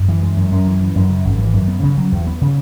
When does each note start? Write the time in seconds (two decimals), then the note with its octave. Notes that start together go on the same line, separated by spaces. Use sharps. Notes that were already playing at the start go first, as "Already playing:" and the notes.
Already playing: F#2
0.09 E3
0.22 G#3
0.37 F#2
0.52 F#2
0.67 E3
0.81 E3
0.96 F#2
1.10 C#3
1.25 G#1
1.39 E3
1.54 F#2
1.68 B3
1.83 C#3
1.97 F#3
2.12 E2
2.27 B3
2.41 C#3